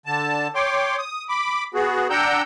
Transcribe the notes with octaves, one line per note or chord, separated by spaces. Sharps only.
D3 A5
C#5 G5 C6 D6
D#6
B5 D6
B3 F#4 G#4
D4 F#5 G5 A#5 E6 G6